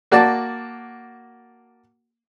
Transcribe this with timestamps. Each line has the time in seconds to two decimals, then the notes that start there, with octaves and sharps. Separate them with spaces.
0.12 A#3 F#4 D5 A5